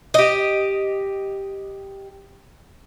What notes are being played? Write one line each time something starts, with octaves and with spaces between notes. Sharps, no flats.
G4 D#5